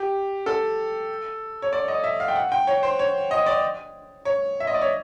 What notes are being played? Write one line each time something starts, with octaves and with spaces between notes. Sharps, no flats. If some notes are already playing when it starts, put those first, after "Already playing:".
Already playing: G4
A4
C#5
D5
D#5
E5
F5
G5
F#5
G5
C#5
C5
C#5
D#5
D5
C#5
E5
D#5
D5
C#5